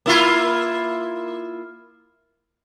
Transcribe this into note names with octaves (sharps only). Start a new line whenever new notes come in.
A#3 E4 F4